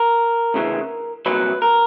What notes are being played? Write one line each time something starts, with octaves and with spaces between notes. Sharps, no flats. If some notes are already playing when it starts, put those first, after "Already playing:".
Already playing: A#4
D2 C#3 E3
C2 A#2 F#3 B4
A#4